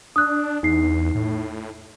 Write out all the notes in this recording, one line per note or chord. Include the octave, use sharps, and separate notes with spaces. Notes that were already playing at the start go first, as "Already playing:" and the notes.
D4 D#6 F#6
E2 D#4 C7
A2